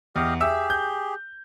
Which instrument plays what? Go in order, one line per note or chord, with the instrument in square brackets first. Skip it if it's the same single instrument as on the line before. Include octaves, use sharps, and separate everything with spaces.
[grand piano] E2 [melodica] G4 D#5 F5
[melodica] G4 G#4 [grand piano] E5 E6
[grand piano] G6